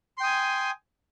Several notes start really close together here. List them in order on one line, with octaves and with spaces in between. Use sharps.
C6 G5 D#6 G#5